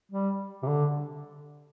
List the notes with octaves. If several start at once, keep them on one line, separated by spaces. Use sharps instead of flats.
G3
C3
D3